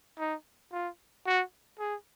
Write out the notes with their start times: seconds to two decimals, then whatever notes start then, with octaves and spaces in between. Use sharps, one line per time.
0.18 D#4
0.72 F4
1.26 F#4
1.79 G#4